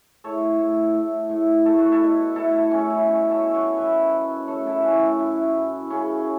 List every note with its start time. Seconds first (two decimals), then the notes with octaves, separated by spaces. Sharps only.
0.24 A2 A4 C#5
0.59 A2
0.94 A2
1.29 A2
1.65 A3 A4
1.79 F#4
1.92 E4 A4
2.01 B2
2.36 A2 E4 A4
2.54 E4
2.71 A2 C#4
2.90 E4
3.07 B2 C#4
3.30 A4 C#5
3.42 B2
3.54 C#5 F#5
3.77 F#2 B4 E5
4.12 F#2
4.48 A3 A4 C#5
4.66 E4 A4
4.83 A2 C#4 F#4
5.01 E4
5.19 F#2 E4
5.54 F#2
5.90 C#3 C#4